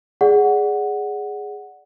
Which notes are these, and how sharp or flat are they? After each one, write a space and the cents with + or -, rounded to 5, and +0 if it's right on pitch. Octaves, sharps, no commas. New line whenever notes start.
G#4 +0 D5 +0 F#5 +0